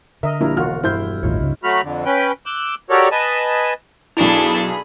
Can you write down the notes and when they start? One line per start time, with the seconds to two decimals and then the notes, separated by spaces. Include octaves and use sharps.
0.23 D3 A#4 D#5 E5
0.41 A#1 G3 A#3 D4 E4 A#4
0.57 E1 F4 F#4 F6
0.83 G2 E4 C5 G6
1.23 A1 D#2 A2 D#4 F4 C#5
1.40 C#2 C#3
1.64 F#3 A3 F#4 B5 F6
1.83 F2 D3
2.05 C#4 B4 G5
2.46 D6 E6 F#6 G6
2.90 F#4 G4 A4 A#4 C#5 D5
3.12 B4 D#5 G#5 A5
4.17 B1 D4 E4 G#4 A4 B5 F7